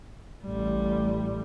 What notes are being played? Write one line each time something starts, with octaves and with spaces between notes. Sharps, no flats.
A1 G3